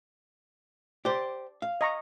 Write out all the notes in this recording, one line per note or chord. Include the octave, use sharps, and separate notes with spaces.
G4 C5 D5
F5
D#5 A#5 C#6